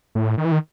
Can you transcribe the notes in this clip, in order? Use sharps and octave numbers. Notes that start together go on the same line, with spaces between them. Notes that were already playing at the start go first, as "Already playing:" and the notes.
A2
D#3
E3
D#3